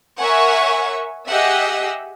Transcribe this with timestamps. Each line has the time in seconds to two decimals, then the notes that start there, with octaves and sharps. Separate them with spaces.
0.19 A#4 C#5 E5 F#5 G#5 C#6
1.27 G4 G#4 D#5 E5 F#5 E6